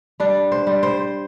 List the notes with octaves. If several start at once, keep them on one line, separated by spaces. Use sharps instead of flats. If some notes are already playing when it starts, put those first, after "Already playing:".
G3 D4
C5
G3
C5